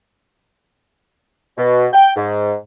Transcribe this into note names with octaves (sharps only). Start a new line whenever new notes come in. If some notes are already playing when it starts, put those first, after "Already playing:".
B2
G5
G#2